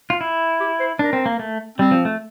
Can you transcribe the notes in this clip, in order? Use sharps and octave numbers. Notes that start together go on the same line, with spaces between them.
F4
E4
G4
C5
D4 A#4
C4
A#3
A3
G3 C4
F3
A3